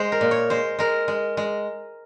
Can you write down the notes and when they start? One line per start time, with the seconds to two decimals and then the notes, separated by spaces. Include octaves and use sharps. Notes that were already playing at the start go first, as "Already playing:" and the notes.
Already playing: G#3 C5
0.12 A#4
0.21 A#2
0.31 C#5
0.50 G#3 C5
0.79 G#3 A#4
1.08 G#3
1.37 G#3